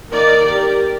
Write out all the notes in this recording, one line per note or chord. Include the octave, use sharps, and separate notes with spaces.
D#3 A#3 D#4 A#4 D5
G4 A#4